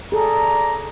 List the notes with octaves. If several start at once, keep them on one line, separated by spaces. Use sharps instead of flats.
G#4 A4 D5 A5 A#5